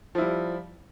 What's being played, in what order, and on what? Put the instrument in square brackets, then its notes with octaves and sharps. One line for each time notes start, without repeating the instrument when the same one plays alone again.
[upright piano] F3
E4
G3